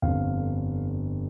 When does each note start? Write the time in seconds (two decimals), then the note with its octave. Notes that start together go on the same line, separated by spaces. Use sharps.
0.02 G1 F2 D3 F5